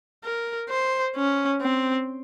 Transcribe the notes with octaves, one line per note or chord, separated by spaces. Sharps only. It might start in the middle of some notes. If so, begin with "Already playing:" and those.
A#4
C5
C#4
C4